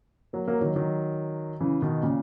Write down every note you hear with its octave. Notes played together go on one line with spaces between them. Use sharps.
F#3 A#3
F#3 A#3
D#3 F#3
D#3 F#3
C#3 E3
B2 D#3
A#2 C#3